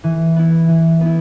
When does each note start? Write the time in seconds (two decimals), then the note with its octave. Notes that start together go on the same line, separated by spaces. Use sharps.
0.04 E3
0.36 B3 E4
0.68 E3
1.01 B3 E4